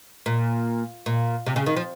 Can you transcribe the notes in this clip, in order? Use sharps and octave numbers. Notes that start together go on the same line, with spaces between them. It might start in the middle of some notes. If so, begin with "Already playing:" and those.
A#2
A#2
C3
C#3
D#3
F3